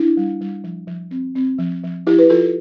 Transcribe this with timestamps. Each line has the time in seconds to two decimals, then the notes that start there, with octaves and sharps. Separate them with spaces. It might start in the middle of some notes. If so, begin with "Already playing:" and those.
Already playing: D4 E4
0.17 G3
0.41 G3
0.64 F3
0.87 F3
1.11 C4
1.35 C4
1.58 F3
1.83 F3
2.07 F3 E4 G4
2.19 B4
2.30 F3 F4 A4